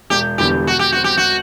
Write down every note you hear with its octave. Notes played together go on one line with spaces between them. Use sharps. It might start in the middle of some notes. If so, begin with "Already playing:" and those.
E1 G4
E2 D3 G3 B3 G4
B2 F#4
G4
F#3 C4 F#4
G4
F#4